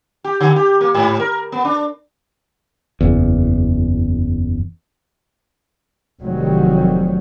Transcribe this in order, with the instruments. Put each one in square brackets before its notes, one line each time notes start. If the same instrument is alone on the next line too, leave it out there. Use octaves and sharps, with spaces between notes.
[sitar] G4
D3
G4
A#3
G#2
A#4
B3
D4
[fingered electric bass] F#1 E2
[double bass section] F1 C3 D#3 F#3 G3